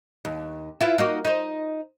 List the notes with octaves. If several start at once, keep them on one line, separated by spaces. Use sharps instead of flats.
D#2
E4 F4 B4
A#3 D#4 F#4
D#4 C5